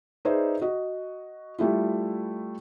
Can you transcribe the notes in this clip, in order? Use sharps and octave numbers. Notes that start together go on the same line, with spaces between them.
D#4 G#4 B4 C5 D5 E5
F#4 D#5
G3 A3 E4 F4